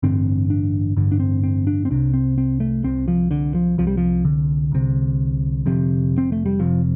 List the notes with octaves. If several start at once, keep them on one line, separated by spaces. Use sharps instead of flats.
A1 G2 D3 C4
D4
A1 G2 D3
D4
C4
C4
D4
C4
C2 C3 D4
C4
C4
A3
C2 C3 C4
F3
D3
F3
C2 C3 F3
G3
F3
D3
C2 C3
F1 F2 C3
C4
A3
G3
F1 F2 C3 F3